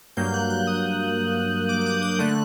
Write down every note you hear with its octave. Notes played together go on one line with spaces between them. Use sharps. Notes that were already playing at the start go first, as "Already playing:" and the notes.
G2 F#3 A#3 G6
F#6
F#6
D#6
D6
D6
D#6
G6
D3 A3 F#6